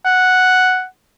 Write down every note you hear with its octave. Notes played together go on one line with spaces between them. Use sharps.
F#5